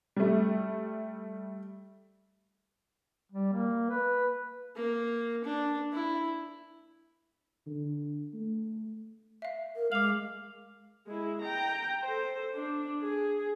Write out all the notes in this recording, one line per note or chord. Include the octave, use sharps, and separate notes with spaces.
G3 A3
G3
A#3
B4
A#3
D4
E4
D3
A3
E5 F5
A#4
G#3 F5 D6 F#7
G#3 E4
G5 A#5
A4 C5
D4
G#4